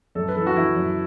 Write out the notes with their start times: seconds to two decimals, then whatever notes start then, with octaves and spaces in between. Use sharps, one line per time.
0.15 F#2 A4
0.28 B4
0.36 E3 A4
0.46 F#4
0.55 E3 E4
0.76 F#2